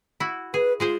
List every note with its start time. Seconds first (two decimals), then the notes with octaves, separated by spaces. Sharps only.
0.20 E4 F#4
0.54 G#4 B4
0.80 G#3 F4 G#4 C5